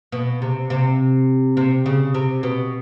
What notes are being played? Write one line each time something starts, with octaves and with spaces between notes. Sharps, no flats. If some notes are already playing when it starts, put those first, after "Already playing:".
B2
C3
C3
C3
C#3
C3
B2